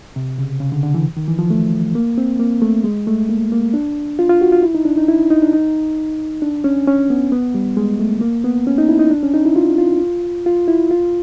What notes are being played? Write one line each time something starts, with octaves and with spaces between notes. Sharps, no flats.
C3
C#3
C#3
D3
D3
E3
D#3
E3
F3
A3
A#3
C4
A#3
A3
G#3
A3
A#3
A#3
D4
F4
F4
F#4
F4
E4
D#4
D4
D#4
E4
D#4
D4
D#4
D4
C#4
C#4
B3
B3
G3
G#3
A3
A#3
B3
C#4
D#4
E4
D#4
D4
C#4
D#4
E4
F4
F4
F4
E4
F4